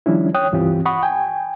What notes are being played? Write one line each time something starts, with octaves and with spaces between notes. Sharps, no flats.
D#3 F3 G3 C#4 D4 E4
C#5 G5 D#6 F#6
C#2 G2 E3 C4 F4 G4
F#5 B5 C#6 D#6
G5 G#5